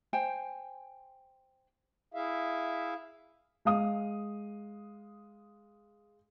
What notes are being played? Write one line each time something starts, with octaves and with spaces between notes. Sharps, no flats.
C5 G5 G#5
E4 G#4 E5 F5
G#3 F5 D#6